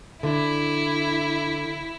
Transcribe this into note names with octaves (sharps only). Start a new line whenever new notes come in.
D3 E4